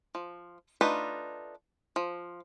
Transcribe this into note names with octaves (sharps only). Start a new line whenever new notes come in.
F3
A3 D4 D#4 F4 B4
F3